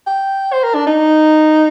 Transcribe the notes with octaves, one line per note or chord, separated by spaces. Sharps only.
G5
C5
A#4
D4
D#4